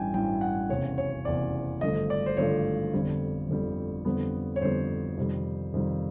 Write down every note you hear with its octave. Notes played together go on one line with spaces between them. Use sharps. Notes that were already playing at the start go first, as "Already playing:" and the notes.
Already playing: A1 G2 E3 G5 G#5
A1 G2 E3 G5
F#5
F1 E2 C#3 C#5
C#5
F1 E2 C#3 D5
G#1 G2 D3 F3 A3 D#5
D5
C5
G#1 G2 D3 F3 A3 C#5
G1 F2 D3 G3
G1 F2 D3 G3
F2 D3 G3 B3
C#5
F2 D3 G3 B3 C5
F2 C3 D#3 G3
F2 C3 D#3 G3